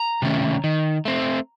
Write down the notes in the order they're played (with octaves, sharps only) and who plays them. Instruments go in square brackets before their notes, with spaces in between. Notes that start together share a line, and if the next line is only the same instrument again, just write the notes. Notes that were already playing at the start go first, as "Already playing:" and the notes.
Already playing: [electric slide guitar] A#5
C3 D#3 A3 C#4
D#3
A3 C4